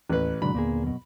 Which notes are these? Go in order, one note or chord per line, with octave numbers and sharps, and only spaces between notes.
A1 D#2 B4 F#6
G#2 B2 D3 F#3 G#3 D4 B5
D#2 A#2 D3 A#3 B3 G#4
F#2 B2